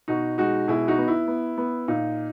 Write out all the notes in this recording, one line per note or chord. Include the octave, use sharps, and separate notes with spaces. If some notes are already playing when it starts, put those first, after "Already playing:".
B2 D#4 F#4
G#3 D#4 F#4
B2 E4 G#4
D#4 F#4
B3
E4
B3
B3
A#2 D#4